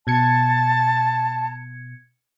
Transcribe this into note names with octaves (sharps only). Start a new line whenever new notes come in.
B2 A5 G#6 C#7